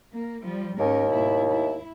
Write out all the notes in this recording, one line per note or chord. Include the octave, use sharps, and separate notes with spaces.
A#3
F3 G3
D#2 G#2 C#4 A#4
G#2 B2 E4
E4